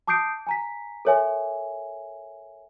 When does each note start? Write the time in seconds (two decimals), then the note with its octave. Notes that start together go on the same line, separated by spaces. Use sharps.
0.07 A5 D6 D#6 G6 C7 D7
0.47 G#5 A#5 B6
1.05 A4 A#4 C#5 E5 G#5